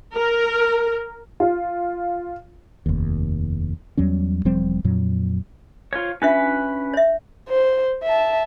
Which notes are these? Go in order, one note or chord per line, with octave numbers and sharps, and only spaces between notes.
A#4
F4
F1 D#2
E2 F#3 G3 C#4
E1 F3 G3 C4
F2 A#2 F#3
F4 C5 C#5
C#4 D4 F4 B4 E5
C#5 E5
C5
E5 A5